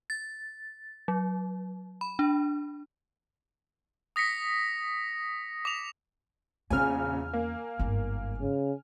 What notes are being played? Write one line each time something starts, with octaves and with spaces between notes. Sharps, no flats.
A6
F#3
B5
D4
D#6 A#6 B6 C#7
D6 F7
A#1 E2 C#3 C#4 G#4 G#5 F6
A#3
G1 G#2
C#3